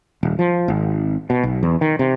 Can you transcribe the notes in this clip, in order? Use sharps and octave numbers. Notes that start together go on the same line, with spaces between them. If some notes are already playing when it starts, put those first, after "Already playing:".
D#1
F3
G#1
B2
B1
E2
D#3
C3